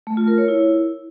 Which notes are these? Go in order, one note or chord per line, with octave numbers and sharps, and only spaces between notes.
A3
F4
A#4
C#5
E4